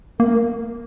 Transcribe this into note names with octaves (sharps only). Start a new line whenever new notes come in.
A#3 A#4